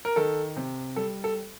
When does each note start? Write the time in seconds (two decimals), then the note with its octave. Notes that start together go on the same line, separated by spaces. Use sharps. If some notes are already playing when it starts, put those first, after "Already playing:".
0.05 A#4
0.16 D#3 A4
0.57 C3
0.96 G3 A4
1.24 A4